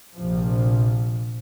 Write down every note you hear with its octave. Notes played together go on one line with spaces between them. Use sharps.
A#1 C3 F3